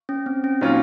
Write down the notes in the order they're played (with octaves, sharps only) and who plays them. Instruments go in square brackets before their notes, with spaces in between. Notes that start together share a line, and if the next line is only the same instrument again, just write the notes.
[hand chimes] C#4
C4
C#4
[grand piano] A#2 F#3 C#4 F4 [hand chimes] D#4